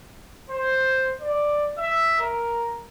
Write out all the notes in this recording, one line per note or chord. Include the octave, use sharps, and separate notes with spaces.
C5
D5
E5
A#4